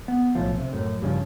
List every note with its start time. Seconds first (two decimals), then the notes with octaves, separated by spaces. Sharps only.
0.08 B3
0.35 B1 A2 F3
0.58 C3
0.73 F#2 A2
1.02 G2 C#3 E3 F3